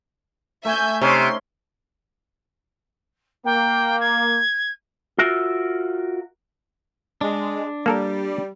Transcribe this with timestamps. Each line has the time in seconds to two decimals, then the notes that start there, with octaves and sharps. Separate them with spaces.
0.65 A3 E5 G#5 G6
1.01 C3 C#4 D#4 C6
3.45 A#3 G5
4.00 G#6
5.18 F4 F#4 A#4 E5
7.21 G#3 D4
7.86 G3 A#3 A4 A#4